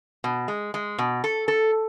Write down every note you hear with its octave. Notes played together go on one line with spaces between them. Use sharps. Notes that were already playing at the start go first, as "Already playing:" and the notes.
B2
G#3
G#3
B2
A4
A4